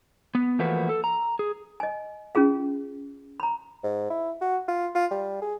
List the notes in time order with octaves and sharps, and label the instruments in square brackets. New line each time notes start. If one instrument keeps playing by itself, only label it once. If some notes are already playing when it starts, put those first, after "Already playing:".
[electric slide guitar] B3
E3 F3 A3 A#3 F#4 B4
A4
A#5
G#4
[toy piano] D#5 G#5
C#4 F4 G#4 F5
A#5 B5
[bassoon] G#2
E4
F#4
F4
F4
G3
G#4